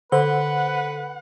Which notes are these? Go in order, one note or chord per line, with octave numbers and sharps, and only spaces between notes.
D3 B4 C5 F#5